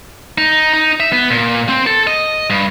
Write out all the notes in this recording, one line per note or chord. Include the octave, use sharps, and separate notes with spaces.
D#4
D#4
E5
B3
A#2
C4
A4
D#5
G2